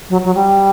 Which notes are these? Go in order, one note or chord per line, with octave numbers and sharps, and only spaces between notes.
F#3
F#3
G3